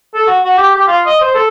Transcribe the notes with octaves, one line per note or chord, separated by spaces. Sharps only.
A4
F#4
F#4
G4
G4
F4
D#5
C5
A4